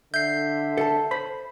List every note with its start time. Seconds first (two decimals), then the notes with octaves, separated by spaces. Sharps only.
0.14 D3 E5 G6 C7
0.77 A4 A5
1.11 C5 B5